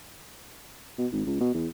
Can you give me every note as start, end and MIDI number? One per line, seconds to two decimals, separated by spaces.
0.98 1.07 47
1.12 1.23 32
1.26 1.36 37
1.41 1.51 47
1.54 1.68 40